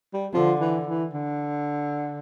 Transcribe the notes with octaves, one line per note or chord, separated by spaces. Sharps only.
G3
D3 F3
E3
E3
D3